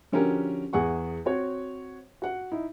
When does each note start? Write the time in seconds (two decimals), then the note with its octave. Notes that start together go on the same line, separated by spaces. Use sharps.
0.12 D3 F3 C#4 F#4 G4 A#4
0.73 E2 G#4 F#5 C#6
1.25 C4 F#4 C#5
2.22 F#4 F#5
2.51 D#4 E4